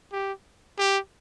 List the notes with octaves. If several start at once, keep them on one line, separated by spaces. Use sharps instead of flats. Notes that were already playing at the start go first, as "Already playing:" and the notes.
G4
G4